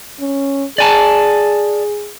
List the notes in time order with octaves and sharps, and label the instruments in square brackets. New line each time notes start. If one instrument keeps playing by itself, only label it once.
[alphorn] C#4
[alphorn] G#4 [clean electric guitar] D5 G#5 A5